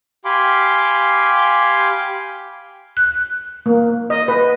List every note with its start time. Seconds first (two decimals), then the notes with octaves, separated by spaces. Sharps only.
0.25 G4 F5 G#5 B5 C6 D6
2.97 F#6
3.66 A#3
4.10 D#5
4.28 B4